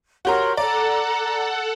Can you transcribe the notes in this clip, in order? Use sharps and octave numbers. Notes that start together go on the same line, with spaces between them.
F#4 G4 A#4 C#5 A#5 C6
A4 D5 F#5 A#5